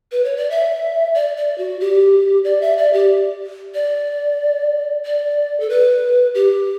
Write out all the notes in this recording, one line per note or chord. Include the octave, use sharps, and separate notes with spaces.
B4
C#5
D5
E5
D5
D5
F#4
G4
D5
E5
D5
G4
D5
D5
A4
B4
G4